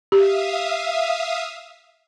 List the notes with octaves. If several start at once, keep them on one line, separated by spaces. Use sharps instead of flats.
G4 E5 F5 D#6